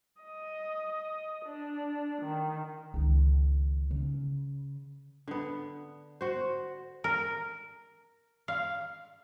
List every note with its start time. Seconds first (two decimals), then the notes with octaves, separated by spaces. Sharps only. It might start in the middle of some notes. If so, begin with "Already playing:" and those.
0.21 D#5
1.44 D4
2.22 D#3
2.94 C#2 D#3
3.91 C#3
5.27 D3 B3
6.21 F#4 C5
7.04 A#4
8.48 F5